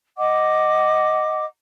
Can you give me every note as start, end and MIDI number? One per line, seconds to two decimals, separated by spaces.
0.17 1.44 75
0.17 1.44 78
0.17 1.44 86